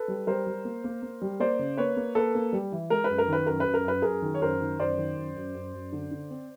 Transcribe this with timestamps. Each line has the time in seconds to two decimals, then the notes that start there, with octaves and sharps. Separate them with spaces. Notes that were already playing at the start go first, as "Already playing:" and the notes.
Already playing: A4 B4
0.08 G3
0.27 G3 A#4 C5
0.47 G3
0.65 A#3
0.84 A#3
1.02 A#3
1.22 G3
1.40 A#3 C5 D5
1.59 C#3
1.77 A#3 B4 C#5
1.97 A#3
2.15 A#3 A4 B4
2.35 A#3
2.53 G3
2.72 E3
2.90 G#3 A#4
3.04 B4
3.09 F#2
3.18 A#4
3.28 D#3 B4
3.46 F#2 A#4
3.60 B4
3.66 F#2
3.74 A#4
3.85 F#2 B4
4.02 F#2 G#4 A#4
4.22 D#3
4.34 C#5
4.42 F#2 A#4 C5
4.60 D#3
4.79 F#2 C5 D5
4.98 D#3
5.16 F#2
5.36 F#2
5.55 F#2
5.74 F#2
5.93 D3
6.11 D3
6.30 C4